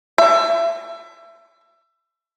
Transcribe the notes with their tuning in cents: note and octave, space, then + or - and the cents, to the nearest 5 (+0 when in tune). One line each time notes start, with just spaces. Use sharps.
E5 +25